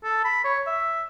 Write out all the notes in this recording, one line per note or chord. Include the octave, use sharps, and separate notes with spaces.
A4
B5
C#5
E5